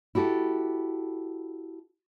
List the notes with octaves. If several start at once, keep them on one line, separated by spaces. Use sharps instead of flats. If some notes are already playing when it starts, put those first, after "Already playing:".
E4 F#4 G4 A4